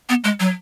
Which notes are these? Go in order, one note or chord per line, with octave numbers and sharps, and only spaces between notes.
B3
G#3
F#3